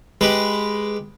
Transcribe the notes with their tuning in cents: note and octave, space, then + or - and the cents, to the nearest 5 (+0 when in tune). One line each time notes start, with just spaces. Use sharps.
G#3 +0 G4 +0 B4 +0